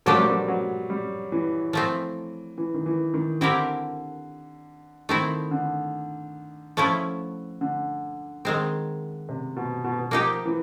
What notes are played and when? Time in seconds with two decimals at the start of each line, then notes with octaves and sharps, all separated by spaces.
0.06 A#2 F3 F#3 A3 D4 G4
0.18 G3
0.29 F#3
0.48 F#3
0.90 G3
1.32 E3
1.73 F3 A3 C4
2.58 E3
2.74 D#3
2.86 E3
3.14 D#3
3.41 D3 C4 E4 G4 A#4
5.09 D#3 A3 C4 E4
5.51 D3
6.77 F3 A3 C#4 E4
7.61 D3
8.45 D#3 G#3 C4
9.29 C3
9.56 B2
9.84 B2
9.99 B2
10.11 F3 A#3 D#4 G4
10.46 E3